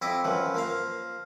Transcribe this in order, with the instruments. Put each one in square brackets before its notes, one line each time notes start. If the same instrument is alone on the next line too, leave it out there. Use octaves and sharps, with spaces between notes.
[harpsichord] F2 E4 D#5 D6
F#2 E3 F3
F3 A#3 F5